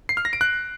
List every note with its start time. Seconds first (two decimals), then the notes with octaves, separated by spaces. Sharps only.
0.09 C7
0.17 F6
0.25 A#6
0.33 D7
0.41 F#6